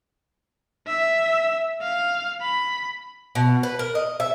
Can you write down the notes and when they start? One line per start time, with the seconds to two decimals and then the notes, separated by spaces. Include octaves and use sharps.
0.87 E5
1.82 F5
2.42 B5
3.35 B2
3.63 B4
3.79 A#4
3.95 D#5
4.20 E5